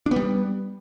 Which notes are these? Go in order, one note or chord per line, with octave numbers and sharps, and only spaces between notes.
G3 B3 D4